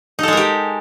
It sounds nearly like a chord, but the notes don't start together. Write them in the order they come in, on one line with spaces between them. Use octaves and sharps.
D#4 A4 G#3 A#4 G4